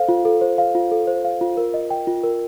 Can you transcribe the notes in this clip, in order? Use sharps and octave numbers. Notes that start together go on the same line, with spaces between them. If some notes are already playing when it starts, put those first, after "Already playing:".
Already playing: A4 C5 F5
F4
A4
C5
F5
F4
A4
C5
F5
F4
A#4
D#5
G5
F4
A#4